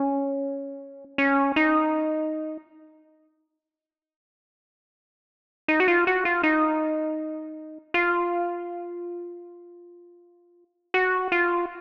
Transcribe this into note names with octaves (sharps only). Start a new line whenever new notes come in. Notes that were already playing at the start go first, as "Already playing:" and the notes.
Already playing: C#4
C#4
D#4
D#4
F#4
F4
F#4
F4
D#4
F4
F#4
F4